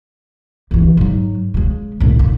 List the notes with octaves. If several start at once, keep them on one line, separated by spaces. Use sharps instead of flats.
D2 E3
G#2 F#3
C#3 G#3
C2 A2
D3